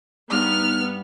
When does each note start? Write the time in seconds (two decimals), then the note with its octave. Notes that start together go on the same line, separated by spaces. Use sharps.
0.31 G2 G3 B3 D#4 F6